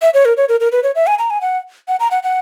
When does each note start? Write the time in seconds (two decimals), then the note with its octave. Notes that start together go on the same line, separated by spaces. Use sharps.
0.02 E5
0.14 C#5
0.25 A#4
0.37 C#5
0.49 A#4
0.60 A#4
0.72 B4
0.83 C#5
0.95 E5
1.07 G#5
1.19 A#5
1.30 G#5
1.41 F#5
1.88 F#5
2.00 A#5
2.11 F#5
2.23 F#5